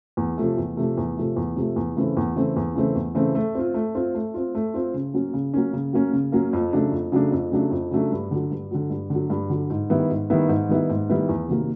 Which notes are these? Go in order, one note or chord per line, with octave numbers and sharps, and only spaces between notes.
E2
C3 F3 A3
E2
C3 F3 A3
E2
C3 F3 A3
E2
C3 F3 A3
E2
C#3 E3 A3 C4
E2
C#3 E3 A3 C4
E2
C#3 E3 A3 C4
E2
C#3 E3 A3 C4
A3
C4 F4
A3
C4 F4
A3
C4 F4
A3
C4 F4
C#3
F#3 A#3 C#4
C#3
F#3 A#3 C#4
C#3
F#3 A#3 C#4
C#3
F#3 A#3 C#4
F2
C#3 F#3 A3 D4
F2
C#3 F#3 A3 D4
F2
C#3 F#3 A3 D4
F2
C#3 F#3 A3 D4
G2
D3 F#3
G2
D3 F#3
G2
D3 F#3
G2
D3 F#3
G#2
D#3 G3 B3 E4
G#2
D#3 G3 B3 E4
G#2
D#3 G3 B3 E4
G#2
D#3 G3 B3 E4
E2
C3 D#3 F#3 A#3